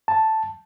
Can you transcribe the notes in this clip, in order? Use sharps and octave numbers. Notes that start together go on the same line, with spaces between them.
A5